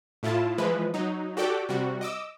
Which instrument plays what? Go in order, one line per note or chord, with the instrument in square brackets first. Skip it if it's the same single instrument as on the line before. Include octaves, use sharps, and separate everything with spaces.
[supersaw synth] A2 E4 F4 A5
E3 F3 G#3 B4
F#3 D#4
F#4 G4 A4 D5 G5 D6
C3 G3 F#4
D#5 D6 E6